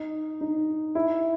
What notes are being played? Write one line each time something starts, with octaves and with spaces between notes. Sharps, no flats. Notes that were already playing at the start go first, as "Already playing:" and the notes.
Already playing: D#4
D#4
E4